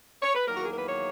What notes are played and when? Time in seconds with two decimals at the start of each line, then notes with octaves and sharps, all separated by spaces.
0.22 C#5
0.34 B4
0.47 E2 D#3 F#3 A#3 A#4
0.57 F#4
0.64 G#4
0.72 A#4
0.78 B4
0.86 C#5